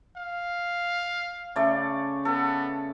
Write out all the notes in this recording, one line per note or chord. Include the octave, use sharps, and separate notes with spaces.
F5
C#3 A3 D5
B3 A4